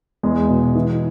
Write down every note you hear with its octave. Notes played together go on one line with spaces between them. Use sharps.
E2 G#3
B2
E3